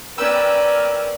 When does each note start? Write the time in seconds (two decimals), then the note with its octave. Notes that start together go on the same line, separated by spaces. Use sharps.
0.18 C#4 A#4 B4 D5 G5 E6